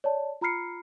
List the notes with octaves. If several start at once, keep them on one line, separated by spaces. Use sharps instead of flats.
C#5 D5 A5
F4 A#5 B5 F6 C7 C#7